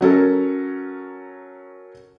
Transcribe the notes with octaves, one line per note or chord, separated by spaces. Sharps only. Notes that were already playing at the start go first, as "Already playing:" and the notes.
F#3 C#4 A4 A#4